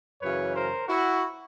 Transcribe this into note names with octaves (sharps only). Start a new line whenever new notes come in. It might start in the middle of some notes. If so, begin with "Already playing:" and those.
F#2 C#3 E3 B4 C#5
A#4 C5
E4 F#4